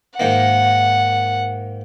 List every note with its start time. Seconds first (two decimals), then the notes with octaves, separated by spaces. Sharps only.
0.20 G#2 D#3 A#3 F#5